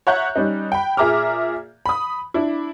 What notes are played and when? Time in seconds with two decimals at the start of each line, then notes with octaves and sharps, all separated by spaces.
0.07 C#5 E5 F#5 A#5 F#6 G6
0.36 G3 C#4 D#4
0.72 G5 B5
0.97 A#2 G#4 E5 A#5 D6 F6
1.86 B5 D#6
2.34 D4 E4